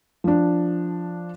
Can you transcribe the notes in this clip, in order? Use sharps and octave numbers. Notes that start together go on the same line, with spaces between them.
F3 D4